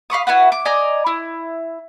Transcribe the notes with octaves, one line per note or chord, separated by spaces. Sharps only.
F5 B5 C#6 D#6
E4 F#4 B4 F#5
D6
D5 D#5 G#5 A#5
E4